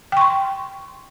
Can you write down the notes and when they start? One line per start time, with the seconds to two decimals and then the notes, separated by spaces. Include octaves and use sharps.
0.12 G5
0.17 C#6
0.21 C6